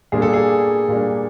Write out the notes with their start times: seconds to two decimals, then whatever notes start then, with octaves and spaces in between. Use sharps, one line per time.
0.12 A#2 G3 A#3 D4 G#4
0.22 A4
0.33 G#4
0.88 A#2 G3 A#3 D4